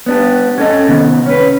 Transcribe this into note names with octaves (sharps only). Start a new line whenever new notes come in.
B3 D4 G4
C#4 A4 D#5
C3 D#3 B3
C#4 B4